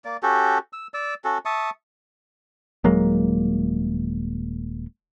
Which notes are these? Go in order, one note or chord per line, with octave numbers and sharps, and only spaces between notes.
A#3 D5
C#4 F#4 G4 A4
E6
D5 E6
C#4 F#4 A4
E5 A5 C#6 D#6
D#1 F#3 G#3 A#3